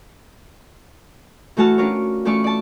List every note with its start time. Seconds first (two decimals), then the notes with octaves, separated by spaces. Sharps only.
1.57 E3 A3 F#4 A5 F6
1.78 C#4 D4 F4 A#4 C#5
2.25 E3 A3 C#4 F4 D5 C#6
2.44 D5 A5